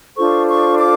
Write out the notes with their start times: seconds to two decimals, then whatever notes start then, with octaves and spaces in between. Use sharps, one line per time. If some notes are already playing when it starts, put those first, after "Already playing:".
0.16 D4 F4 A4 C5 C#6
0.48 C#6
0.78 D6